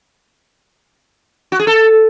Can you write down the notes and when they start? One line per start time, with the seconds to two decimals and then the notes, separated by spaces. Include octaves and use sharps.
1.52 F#4
1.59 G#4
1.67 A4